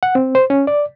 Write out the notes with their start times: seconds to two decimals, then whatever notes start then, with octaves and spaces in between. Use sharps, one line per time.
0.03 F#5
0.15 C4
0.35 C5
0.50 C#4
0.67 D5